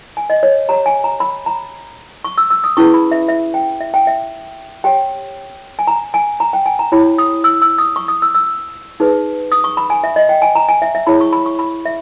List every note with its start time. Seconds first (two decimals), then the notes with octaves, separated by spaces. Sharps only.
0.17 G#5
0.30 D#5
0.43 C#5
0.69 G4 C#5 A#5
0.86 G#5
1.04 A#5
1.20 B5
1.46 A#5
2.24 C#6
2.38 E6
2.50 E6
2.64 D#6
2.77 C#4 E4 G#4 B4 C#6
2.94 B5
3.12 E5
3.28 E5
3.54 G5
3.81 E5
3.94 G5
4.07 E5
4.84 G4 C#5 G5
5.79 G#5
5.87 A#5
6.14 G#5
6.40 A#5
6.53 G5
6.66 G#5
6.79 A#5
6.92 E4 G4 C#5 B5
7.18 D#6
7.44 E6
7.62 E6
7.78 D#6
7.96 C#6
8.08 D#6
8.22 E6
8.35 E6
9.00 D#4 G#4 B4
9.52 D#6
9.64 C#6
9.77 B5
9.90 G#5
10.04 E5
10.16 D#5
10.29 G5
10.42 G#5
10.55 A#5
10.69 G#5
10.82 E5
10.95 E5
11.07 E4 G#4 C#5 B5
11.21 C#6
11.33 B5
11.46 C#6
11.59 B5
11.86 E5